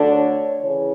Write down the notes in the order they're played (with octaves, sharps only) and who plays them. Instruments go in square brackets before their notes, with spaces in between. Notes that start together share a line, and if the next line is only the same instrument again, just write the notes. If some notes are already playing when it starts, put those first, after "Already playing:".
Already playing: [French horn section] D2 D3 A3 D4
C#5
C#3 E3 C#5